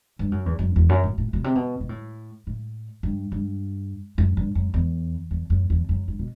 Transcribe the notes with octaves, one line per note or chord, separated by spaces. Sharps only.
G2
F#2
E2
F#2
E2
F#2
A2
A2
B2
C3
B2
B2
A2
A2
G2
G2
F#2
G2
F#2
E2
E2
F#2
E2
F#2
G2
B2